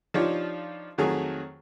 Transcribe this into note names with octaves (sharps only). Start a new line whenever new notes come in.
F3 D4 D#4 F4 G4 C#5
F2 D#3 F#3 A3 G#4